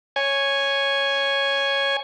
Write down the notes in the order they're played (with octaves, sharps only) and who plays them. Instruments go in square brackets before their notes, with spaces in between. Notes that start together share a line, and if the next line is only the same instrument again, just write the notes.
[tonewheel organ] C#5 G#5